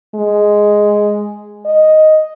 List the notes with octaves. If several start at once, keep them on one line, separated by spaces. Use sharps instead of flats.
G#3
D#5